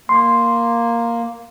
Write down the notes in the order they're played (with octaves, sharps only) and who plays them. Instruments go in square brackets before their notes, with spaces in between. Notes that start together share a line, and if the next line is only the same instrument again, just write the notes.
[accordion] A#3 [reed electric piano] C6